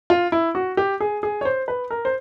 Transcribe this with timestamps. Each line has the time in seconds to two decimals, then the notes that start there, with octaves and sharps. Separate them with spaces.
0.10 F4
0.32 E4
0.55 F#4
0.77 G4
1.00 G#4
1.23 G#4
1.41 C#5
1.45 C5
1.68 B4
1.91 A#4
2.05 C5